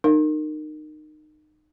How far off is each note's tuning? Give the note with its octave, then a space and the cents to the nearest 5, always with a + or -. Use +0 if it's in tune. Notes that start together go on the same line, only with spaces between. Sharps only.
D#4 -25 A#4 -20